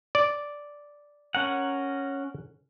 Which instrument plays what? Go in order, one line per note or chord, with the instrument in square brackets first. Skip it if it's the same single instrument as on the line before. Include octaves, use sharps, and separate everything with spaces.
[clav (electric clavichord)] D5
[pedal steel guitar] C#4 A#4 F#5